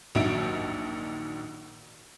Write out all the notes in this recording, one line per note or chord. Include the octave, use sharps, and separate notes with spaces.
A#1 D#2 F#3 D#4 E5 D7